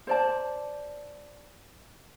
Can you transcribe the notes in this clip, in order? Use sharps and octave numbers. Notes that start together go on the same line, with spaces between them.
C5 D5 A5